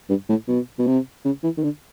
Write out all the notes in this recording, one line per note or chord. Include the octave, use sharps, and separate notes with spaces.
G2
A2
B2
B2
C3
C#3
E3
D#3
D3